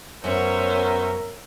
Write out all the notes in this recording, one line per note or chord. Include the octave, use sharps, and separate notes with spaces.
F#2 B3 C#4 A#4 C5 C#5 E5